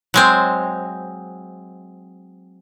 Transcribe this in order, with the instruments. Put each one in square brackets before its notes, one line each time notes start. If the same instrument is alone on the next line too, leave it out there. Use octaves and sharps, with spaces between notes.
[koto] F#3 G#3 C4